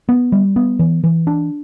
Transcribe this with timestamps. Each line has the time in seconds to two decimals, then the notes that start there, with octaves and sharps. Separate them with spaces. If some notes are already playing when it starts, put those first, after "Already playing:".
0.09 B3
0.32 G3
0.56 B3
0.79 E3
1.04 E3
1.27 D4